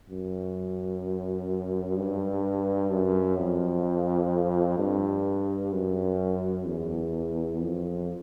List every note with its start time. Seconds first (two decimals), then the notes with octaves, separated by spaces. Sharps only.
0.09 F#2
1.97 G2
2.91 F#2
3.38 F2
4.79 G2
5.73 F#2
6.67 E2
7.62 F2